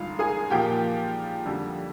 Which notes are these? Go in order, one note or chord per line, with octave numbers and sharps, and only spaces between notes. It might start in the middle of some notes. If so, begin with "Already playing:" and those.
Already playing: G2 D3 G#3 D#4 F4 F5
G#4 G#5
A#2 F3 A#3 G4 G5
F2 D3 G3